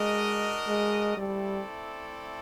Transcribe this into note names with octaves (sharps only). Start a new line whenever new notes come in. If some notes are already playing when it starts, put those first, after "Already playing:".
Already playing: G#3 D4 F#4 A#4 D#5
G#3
G3 A3 C4 E4 A4 D5